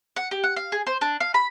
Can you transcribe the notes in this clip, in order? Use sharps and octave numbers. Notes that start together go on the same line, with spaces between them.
F#5
G4
F#5
F5
G#4
C5
D4
F5
B5